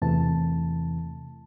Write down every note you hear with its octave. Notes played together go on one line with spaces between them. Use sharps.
E2 C3 E3 A3 A5